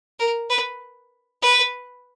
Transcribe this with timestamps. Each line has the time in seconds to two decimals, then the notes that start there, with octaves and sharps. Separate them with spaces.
0.19 A#4
0.50 B4
1.42 B4